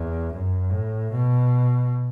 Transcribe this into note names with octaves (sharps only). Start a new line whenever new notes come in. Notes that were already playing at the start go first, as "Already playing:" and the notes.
Already playing: E2
F#2
A2
B2